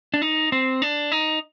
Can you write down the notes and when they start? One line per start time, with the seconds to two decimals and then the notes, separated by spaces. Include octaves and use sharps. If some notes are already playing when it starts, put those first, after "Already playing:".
0.14 D4
0.22 D#4
0.52 C4
0.82 D4
1.12 D#4